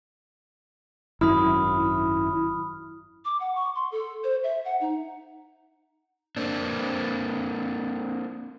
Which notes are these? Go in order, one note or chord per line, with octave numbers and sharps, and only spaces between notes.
G#1 F#2 E4 B5 D#6 F6
D6
F#5
C#6
C6
A4
C5
E5
F#5
D#4
A#3 C4 D4